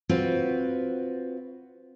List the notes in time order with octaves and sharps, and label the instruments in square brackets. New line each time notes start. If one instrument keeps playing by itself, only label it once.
[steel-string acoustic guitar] C4 F4 F#4 B4